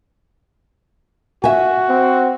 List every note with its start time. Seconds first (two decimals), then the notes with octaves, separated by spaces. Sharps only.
1.44 F#4 E5 G#5
1.89 C4